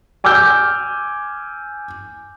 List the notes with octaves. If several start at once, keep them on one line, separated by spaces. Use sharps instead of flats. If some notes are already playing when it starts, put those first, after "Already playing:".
G#5 D6 E6 F6 G6